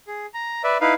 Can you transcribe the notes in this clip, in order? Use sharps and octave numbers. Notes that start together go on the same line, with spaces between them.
G#4
A#5
B4 D5 E5
D#4 E4 B4 F5